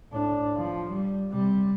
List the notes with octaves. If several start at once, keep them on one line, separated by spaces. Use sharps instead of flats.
A2 D4
F3
G3
C3 G3